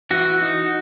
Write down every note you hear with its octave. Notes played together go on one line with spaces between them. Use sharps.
E3 F#4
D#4